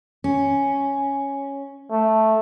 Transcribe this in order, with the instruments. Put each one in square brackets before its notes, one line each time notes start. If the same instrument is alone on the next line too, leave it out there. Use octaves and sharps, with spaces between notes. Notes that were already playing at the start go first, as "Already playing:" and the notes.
[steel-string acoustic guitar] C#4
[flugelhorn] A3